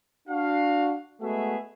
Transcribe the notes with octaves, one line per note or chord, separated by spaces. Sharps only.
D4 F#4 F5
G#3 A3 B3 F#4 G#4 E5